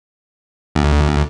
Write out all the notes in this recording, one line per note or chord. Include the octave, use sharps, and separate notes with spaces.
D2